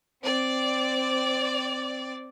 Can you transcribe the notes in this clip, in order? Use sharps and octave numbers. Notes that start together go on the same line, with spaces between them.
C4 D5